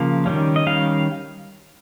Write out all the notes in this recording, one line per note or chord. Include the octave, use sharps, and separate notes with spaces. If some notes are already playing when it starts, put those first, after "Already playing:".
Already playing: C#3 F3 A#3
D#3 G3 C#4
D#5
D#3 G3 C#4 F5